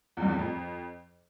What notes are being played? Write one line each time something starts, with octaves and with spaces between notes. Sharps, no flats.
E2
G2
E2
A2
F2